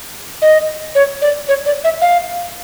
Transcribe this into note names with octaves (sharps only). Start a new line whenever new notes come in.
D#5
C#5
D5
C#5
D5
E5
F5